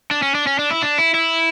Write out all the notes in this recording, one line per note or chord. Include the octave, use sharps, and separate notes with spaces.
D4
C#4
D4
C#4
D4
E4
D4
E4
E4